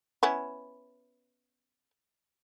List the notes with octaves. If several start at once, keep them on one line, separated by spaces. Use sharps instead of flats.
B3 C#4 E4